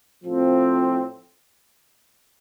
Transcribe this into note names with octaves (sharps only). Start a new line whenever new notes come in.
A2 F3 C4 F4